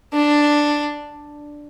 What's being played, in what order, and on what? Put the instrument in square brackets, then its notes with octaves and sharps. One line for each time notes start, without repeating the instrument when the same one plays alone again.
[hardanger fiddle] D4